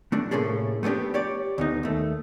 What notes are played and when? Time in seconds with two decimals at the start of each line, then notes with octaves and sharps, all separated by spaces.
0.12 A3 D4
0.31 A2 C3 A#3 C#4 G#4 A4
0.83 A3 B3 C4 D4 G4
1.14 G4 C#5 D5
1.58 D2 B3 D#4
1.83 D#2 A3